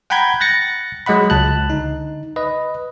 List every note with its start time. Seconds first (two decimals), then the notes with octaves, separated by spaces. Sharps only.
0.10 F#5 G5 A#5 B5 G6 G#6
0.40 F#6 A6 A#6 C#7
1.06 F#3 G#3 D#5 F#5 B5
1.30 C#2 A5 F#6
1.70 D3 D#4
2.36 B4 D#5